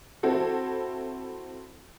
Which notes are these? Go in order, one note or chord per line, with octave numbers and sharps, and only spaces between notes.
C4 E4 F#4 A4